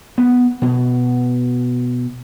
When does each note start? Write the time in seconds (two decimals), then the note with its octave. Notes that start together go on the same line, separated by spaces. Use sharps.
0.18 B3
0.62 B2